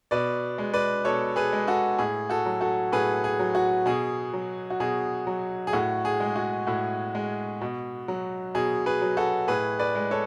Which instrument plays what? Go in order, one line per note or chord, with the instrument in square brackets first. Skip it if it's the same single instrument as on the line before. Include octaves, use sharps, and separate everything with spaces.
[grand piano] B2 B4 D5
G#3
B4 D5
B2 A4 C#5
G#4 B4
G#3
F#4 A4
A2 G#4
F#4 A4
F#3
F#4 A4
A2 G#4 B4
G#4
F#3
F#4
B2 G#4
F#3
F#4
B2 G#4
F#3
G#4
A2 F#4
G#4
G#3
F#4
A2 F#4
G#3
B2
F#3
B2 G#4
G#4 B4
F#3
F#4 A4
A2 G#4 B4
B4 D5
G#3
A4 C#5